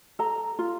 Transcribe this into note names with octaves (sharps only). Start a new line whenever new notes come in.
A4 A#5
F4